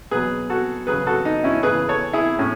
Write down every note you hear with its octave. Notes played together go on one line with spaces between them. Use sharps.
B2 F#3 G#4 B4
F#4 A4
C#3 F#3 G#4 B4
F#4 A4
D#4
C#4 E4
C#3 E3 G#4 B4
A4 C#5
E4 G#4
A2 C#4